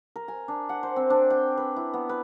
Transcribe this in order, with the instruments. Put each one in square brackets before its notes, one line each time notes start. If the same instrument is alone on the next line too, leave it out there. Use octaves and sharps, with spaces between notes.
[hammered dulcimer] A#4
G#5
D4
F#5
C5
C4
D4
G5
B4
E4
B3
B4